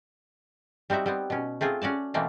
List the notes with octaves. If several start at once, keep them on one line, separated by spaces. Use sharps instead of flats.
G3 C4 D#4 F#4 E5
G3 B3 C4
B2 C#4
A3 C4 F4 G#4
C#4 F#4 D5 A5
B2 E3 A3 A#3 C4